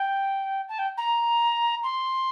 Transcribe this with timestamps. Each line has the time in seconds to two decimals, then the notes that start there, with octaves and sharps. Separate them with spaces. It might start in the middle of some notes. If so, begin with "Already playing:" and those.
Already playing: G5
0.68 A5
0.78 G5
0.97 A#5
1.83 C6